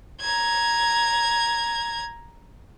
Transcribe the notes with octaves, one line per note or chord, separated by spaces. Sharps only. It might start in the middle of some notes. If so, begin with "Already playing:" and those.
A#5 G#6